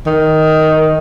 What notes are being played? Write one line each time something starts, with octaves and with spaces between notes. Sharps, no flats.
D#3